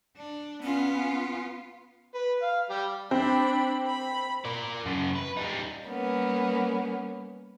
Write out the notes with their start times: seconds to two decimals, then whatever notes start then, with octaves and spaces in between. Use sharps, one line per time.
0.17 D4
0.62 B3 C#4 F4
2.14 B4
2.42 F5
2.70 G3 G4
3.11 C4 D4 B5
3.86 B5
4.45 A#4 D5
4.86 F#2 C#3
5.15 B4
5.37 G3 D#4
5.87 G3 A#3 B3 C#4